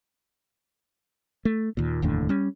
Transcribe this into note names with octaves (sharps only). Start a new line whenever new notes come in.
A3
D#2 A#2
F1 D#2 A2 D3
G3 C#4